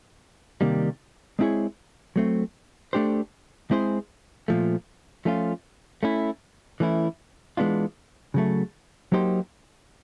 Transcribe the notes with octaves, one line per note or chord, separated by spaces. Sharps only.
C3 D#3 G3 A#3
G#3 C4 E4 G#4 C#5
F#3 A3 C4
A3 D4 G4 C5
G#3 C4 E4 G#4 C5
A#2 F3 A3
F3 A3 C#4 F4
A3 C#4 E4
E3 A3 C#4 E4
E3 G#3 B3 D4 F4
C#3 F#3 A3
F#3 A#3 D#4 G4 C5